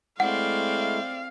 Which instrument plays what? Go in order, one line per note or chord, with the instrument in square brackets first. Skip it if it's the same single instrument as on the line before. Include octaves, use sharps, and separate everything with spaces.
[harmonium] G#3 A3 E4 [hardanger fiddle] C4 D5 [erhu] F5 [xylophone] F#5